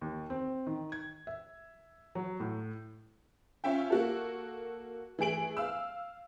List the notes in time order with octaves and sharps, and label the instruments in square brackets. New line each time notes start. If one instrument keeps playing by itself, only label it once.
[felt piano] D#2
C4
D#3
G#6
E5
F#3
A2
[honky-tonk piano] C#4 F4 E5 G5
A#3 F#4 A4
E3 A3 G#4 D7 F#7
F5 E6